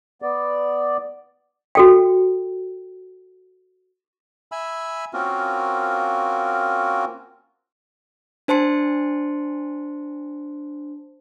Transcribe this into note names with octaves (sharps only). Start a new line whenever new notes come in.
B3 D5
F#4 A4 G5
E5 G#5 B5 E6
A#3 C4 C#4 F4 F#4 A#4
D4 C5 A5 C6 C#7